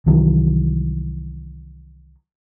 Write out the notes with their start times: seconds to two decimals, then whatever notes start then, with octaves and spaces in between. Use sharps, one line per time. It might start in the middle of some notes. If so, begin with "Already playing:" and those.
0.06 C2 D#3 E3 F#3